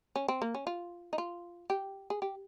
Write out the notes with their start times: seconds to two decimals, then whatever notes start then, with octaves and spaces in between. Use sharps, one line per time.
0.16 C#4
0.28 C4
0.42 A#3
0.55 C#4
0.67 F4
1.13 D#4
1.18 F4
1.70 G4
2.10 G#4
2.22 G4